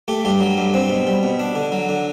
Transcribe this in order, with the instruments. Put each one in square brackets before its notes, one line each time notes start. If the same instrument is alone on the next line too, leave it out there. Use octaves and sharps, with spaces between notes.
[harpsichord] A3 G4
G2 G4
F#3
G2
C4
B2
G3
B2
D4
D3
F#3
D3